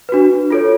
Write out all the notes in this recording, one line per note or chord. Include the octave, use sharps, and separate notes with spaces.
D4 F#4 B4
F4 A4 C#5